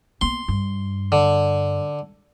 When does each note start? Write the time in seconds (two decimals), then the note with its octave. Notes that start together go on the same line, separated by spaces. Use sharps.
0.21 A#3 B3 C6
0.48 G2
1.12 D3